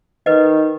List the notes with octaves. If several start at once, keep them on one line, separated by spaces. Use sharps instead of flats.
D#3 B4 D#5